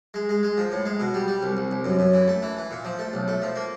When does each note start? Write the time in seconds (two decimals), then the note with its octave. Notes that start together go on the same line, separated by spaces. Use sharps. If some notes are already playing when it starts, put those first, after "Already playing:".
0.14 G#3
0.29 G#3
0.43 G#3
0.58 F3
0.72 A2
0.85 G#3
1.00 B2
1.14 G3
1.28 G3
1.43 C2
1.57 C2
1.71 C2
1.85 F#2
1.99 F#2
2.14 E3
2.28 A3
2.42 E3
2.57 E3
2.71 A#2
2.85 F3
2.99 A3
3.13 B1
3.28 A3
3.42 F3
3.56 A#3